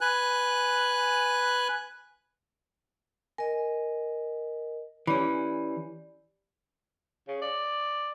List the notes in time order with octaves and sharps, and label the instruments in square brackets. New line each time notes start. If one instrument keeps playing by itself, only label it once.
[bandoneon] B4 G#5 F#6
[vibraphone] A#4 D#5 [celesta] G#5
[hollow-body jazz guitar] E3 C#4 [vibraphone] G4 D5 [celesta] B5
[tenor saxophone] C#3
D5